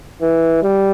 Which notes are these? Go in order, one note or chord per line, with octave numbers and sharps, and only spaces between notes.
E3
G3